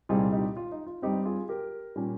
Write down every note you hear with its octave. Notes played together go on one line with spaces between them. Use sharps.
C2 A#2 G3 C4 D#4 F4 G#4
D#4 G4
F4
D#4
F4
G2 G3 C4 D#4 G4
F4 G#4
G4 A#4
A#2 G3 C#4